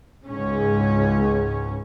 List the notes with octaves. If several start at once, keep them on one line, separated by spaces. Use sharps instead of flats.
C#2 G#2 C#4